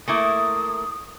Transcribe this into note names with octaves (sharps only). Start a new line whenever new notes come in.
A3 A#3 E4 D#6